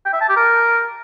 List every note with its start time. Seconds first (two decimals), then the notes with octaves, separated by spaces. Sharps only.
0.05 G5
0.13 E5
0.21 A5
0.29 G4
0.37 A#4